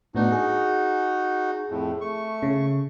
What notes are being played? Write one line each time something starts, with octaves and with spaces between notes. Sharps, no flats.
A2 B3 D4 D#4 F#4
G#4
F2 A2
A3 C#6
C#3